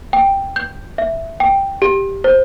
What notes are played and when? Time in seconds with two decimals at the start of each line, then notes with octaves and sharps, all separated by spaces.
0.13 G5
0.56 G6
0.98 E5
1.40 G5
1.82 G4
2.24 C5